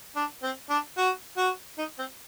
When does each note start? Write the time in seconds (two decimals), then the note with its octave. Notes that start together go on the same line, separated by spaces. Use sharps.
0.16 D4
0.43 C4
0.70 D4
0.97 F#4
1.37 F#4
1.78 D#4
1.99 C4